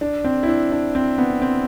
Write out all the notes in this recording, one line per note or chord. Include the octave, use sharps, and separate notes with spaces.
D4
C4
E4
D4
D4
C4
B3
C4